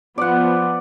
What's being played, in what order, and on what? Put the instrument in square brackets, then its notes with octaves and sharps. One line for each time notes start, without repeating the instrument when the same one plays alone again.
[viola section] F3 B3 [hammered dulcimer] D5 F#5